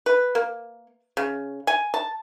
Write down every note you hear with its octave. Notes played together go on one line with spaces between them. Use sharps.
B4
A#3
C#3
G#5
A5